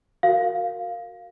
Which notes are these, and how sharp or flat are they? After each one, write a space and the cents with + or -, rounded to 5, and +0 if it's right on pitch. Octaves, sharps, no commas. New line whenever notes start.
F#4 +0 A#4 -15 F5 +0